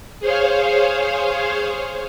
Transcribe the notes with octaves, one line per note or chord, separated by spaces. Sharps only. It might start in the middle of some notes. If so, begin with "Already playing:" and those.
G#4 C5 C#5 F5